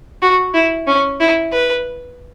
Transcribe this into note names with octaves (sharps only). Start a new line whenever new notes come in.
F#4
E4
C#4
E4
B4